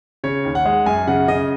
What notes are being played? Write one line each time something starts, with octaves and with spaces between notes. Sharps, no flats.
C#3 C#5
D#2
F#5
G#3
F#2 G#5
C#3 F#5
C#3 D#5